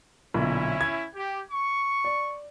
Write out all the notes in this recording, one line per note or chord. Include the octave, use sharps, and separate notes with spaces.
B1 A#2 D3 C#4 E4
G#6
G4
C#6
D5